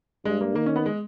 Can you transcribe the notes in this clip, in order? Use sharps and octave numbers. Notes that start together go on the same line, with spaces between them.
G2 G#3
A#3
D#3 A#3
C#4
B3
G#3